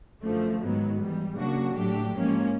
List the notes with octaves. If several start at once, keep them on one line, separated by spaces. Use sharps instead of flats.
F#2 D3 F3 A3
G#2 D#3 F#3 B3
G#2 E3 G3
C#3 F#3 A#3 D4 F#4
A2 F#3 A3 D4 G4
G#2 F3 A#3 C#4